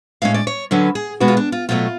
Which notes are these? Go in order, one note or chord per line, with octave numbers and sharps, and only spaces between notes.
A2 G#3 C#4 F5
D5
C#5
D3 F#3 C#4 B4
G#4
B2 G#3 B3 D4 F#4
F4
D4
F4
B2 F#3 A3 F4